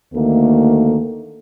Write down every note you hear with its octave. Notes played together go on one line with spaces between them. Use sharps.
D2 D#3 A3 A#3 A4